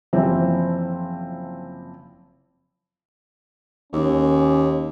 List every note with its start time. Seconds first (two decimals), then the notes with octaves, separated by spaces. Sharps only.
0.13 F#1 E3 F3 C4 E4 C5
3.93 D#2 C#4